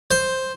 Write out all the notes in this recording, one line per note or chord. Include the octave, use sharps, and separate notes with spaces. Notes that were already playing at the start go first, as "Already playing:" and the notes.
C5